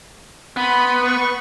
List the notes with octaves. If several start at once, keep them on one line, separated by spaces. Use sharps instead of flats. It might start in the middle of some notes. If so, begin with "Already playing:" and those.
B3 B5 C6
B4 C#6